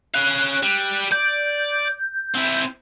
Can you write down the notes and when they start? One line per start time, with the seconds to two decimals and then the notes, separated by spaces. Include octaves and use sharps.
0.14 C#4 F5 F#6
0.63 G3
1.12 D5 G6
2.35 C4 E4